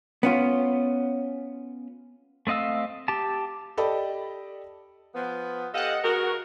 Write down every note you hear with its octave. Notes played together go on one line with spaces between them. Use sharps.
B3 C#4 F4
A3 C4 D#5 F5 E6
G4 A5
G4 A4 D5 D#5 B5
F3 B3
G4 A4 D#5 F5 F#5
B2 F#4 G#4 A#4